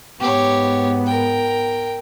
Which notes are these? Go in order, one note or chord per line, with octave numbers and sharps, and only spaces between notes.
G#2 B3 G4 C#5
A#4 G5